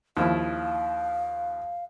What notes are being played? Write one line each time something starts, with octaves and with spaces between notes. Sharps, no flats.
D#2 F3 E4 F5